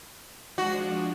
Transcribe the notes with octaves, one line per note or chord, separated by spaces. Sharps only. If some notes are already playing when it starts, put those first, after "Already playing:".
F3 G#3 D4 F#4